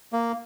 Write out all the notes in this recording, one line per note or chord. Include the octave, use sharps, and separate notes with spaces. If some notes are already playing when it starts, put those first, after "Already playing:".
A#3